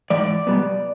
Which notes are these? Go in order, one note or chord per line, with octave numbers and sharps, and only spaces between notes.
G#2 E3 D5
B2 G3 B3